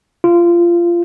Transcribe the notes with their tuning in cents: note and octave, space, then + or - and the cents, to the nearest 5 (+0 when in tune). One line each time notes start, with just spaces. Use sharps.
F4 -20